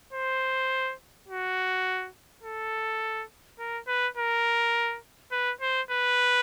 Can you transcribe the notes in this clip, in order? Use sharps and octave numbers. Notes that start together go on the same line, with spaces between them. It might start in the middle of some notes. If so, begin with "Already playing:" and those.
C5
F#4
A4
A#4
B4
A#4
B4
C5
B4